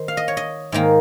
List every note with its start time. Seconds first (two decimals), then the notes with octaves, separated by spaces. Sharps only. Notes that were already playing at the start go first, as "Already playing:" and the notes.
Already playing: D#3 C5
0.08 F5
0.17 D#5
0.28 C#5
0.37 D#5
0.72 G#2 D#3 A#3